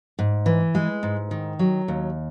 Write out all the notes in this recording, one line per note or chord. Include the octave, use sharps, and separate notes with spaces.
G#2
E3
G#3
G#2
D#3
F#3
D#2